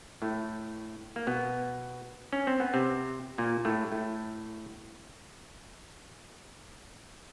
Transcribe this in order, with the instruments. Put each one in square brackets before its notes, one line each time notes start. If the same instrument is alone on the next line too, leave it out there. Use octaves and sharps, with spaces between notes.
[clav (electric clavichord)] A2 A3
A#3
B2 B3
C#4
C4
B3
C3 C4
A#2 A#3
A2 A3
A2 A3